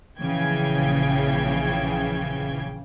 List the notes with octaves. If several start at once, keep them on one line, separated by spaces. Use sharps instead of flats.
A#1 C#3 E3 F3 G5 G#6